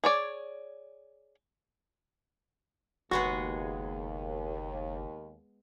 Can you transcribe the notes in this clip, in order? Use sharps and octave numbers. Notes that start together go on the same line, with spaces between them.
G#4 C#5 D5
F#1 D#2 G#3 B3 F#4 G#4